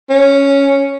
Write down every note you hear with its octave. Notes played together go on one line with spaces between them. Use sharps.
C#4